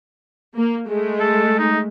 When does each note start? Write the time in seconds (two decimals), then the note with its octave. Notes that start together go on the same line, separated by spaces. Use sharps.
0.56 A#3
0.88 G#3 A3
1.20 A4
1.59 D#4